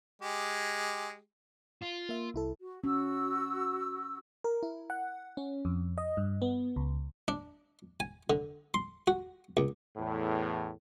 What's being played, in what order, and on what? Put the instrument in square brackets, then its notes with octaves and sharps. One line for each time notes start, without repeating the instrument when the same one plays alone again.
[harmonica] G#3 G4
[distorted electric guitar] F4
[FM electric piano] A#3 E5
C2 E4 A4
[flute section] F#4
[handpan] C#4 [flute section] F#4 E6
[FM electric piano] A#4
E4
F#5
C#4
F2
D#5
G2
B3
C#2
[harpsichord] D4
G#5
D3
C6
F#4
C#2
[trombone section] E2 A2